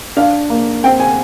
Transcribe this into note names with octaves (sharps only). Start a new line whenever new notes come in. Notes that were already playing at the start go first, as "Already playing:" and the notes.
D4 F5
A#3
C4 G5
G#5